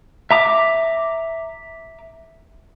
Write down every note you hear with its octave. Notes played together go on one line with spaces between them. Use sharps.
E5 A#5 D6